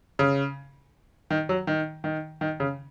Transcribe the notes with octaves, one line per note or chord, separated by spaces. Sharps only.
C#3
D#3
F#3
D#3
D#3
D#3
C#3